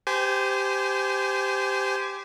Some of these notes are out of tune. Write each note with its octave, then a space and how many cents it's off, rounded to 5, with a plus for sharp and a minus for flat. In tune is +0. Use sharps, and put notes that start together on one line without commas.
G4 +0 C5 -25 G#5 +20